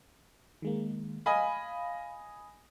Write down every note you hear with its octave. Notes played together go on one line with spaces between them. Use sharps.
D#3 G#3 A#3
D#5 F5 G#5 B5